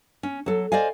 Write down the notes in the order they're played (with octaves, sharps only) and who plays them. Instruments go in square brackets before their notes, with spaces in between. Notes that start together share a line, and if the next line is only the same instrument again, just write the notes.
[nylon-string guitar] C#4
F#3 A4
C5 D5 D#5 F5 G#5